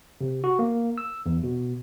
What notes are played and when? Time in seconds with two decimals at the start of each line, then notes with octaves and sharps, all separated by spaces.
0.21 C3
0.44 F#4
0.59 A#3
0.98 E6
1.26 E2
1.43 B2